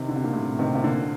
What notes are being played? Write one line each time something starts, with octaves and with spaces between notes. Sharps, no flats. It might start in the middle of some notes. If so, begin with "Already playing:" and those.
Already playing: C3 D#3
D3
C3
A#2 D3
A2 C3
C3 D#3
C3
A#2 D3